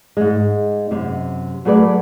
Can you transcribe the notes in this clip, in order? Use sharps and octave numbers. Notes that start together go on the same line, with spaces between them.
G#2 G#3
F#2 C3
F#3 A3 G#4 B4 D5